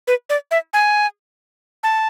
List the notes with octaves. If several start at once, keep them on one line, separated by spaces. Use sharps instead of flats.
B4
D5
E5
G#5
A5